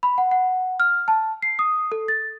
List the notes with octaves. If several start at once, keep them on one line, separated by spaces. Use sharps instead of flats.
B5
F#5
F#5
F6
A5
C7
D#6
A4
A6